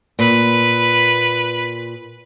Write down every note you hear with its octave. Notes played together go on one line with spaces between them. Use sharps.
A#2 B4